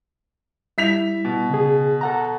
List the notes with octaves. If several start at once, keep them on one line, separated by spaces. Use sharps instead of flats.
G3 E4 E5 B6 F7
B2
C#3 G#4
A4 F#5 A#5